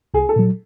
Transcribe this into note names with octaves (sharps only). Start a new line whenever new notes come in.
C2 G#4
A4
A#2 F#3